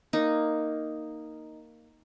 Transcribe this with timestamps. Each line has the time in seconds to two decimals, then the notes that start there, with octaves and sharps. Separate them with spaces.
0.13 A#3 D#4